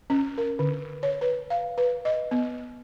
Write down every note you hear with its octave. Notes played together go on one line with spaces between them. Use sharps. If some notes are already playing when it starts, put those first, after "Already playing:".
C#4
A#4
D3
C#5
B4
F5
B4
D#5
B3